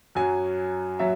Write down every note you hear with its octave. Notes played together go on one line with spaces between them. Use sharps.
F#2 F#3 G#5
F#3 E5